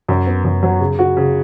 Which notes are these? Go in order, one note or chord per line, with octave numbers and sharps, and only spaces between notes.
F#2
B3
F#2
F#3
C#3
F#4
C#3